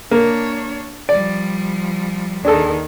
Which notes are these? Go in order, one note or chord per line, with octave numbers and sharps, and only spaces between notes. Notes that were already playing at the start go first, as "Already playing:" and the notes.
A#3 D4 C#5
F3 G3 D5
D#2 D#3 D4 G#4 A4